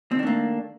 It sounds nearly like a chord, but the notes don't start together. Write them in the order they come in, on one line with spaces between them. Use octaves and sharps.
C4 D#3 D4 A3 A#3